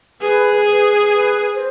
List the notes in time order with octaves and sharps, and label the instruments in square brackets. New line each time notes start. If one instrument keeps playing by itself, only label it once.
[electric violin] G#4 [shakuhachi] B4
[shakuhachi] B4
B4
C5